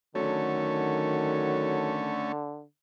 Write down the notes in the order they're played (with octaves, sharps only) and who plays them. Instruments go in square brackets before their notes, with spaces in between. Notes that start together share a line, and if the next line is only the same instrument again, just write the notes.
[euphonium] D3 [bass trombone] D#3 [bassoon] F#3 [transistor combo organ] A3 C#4